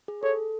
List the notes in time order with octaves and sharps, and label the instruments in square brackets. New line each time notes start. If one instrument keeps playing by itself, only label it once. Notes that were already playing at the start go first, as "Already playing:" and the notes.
[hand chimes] G#4
[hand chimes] A4 [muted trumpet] C#5